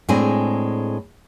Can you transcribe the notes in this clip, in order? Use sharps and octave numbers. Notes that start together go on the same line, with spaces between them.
A2 G#3 C4 D4 G#5